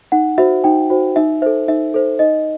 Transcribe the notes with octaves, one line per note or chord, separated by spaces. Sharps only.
D#4 F#5
F#4 C5 E5
D#4 G5
F#4 C5
D#4 E5
A4 C5 E5
D#4 E5
A4 C5
D#4 D#5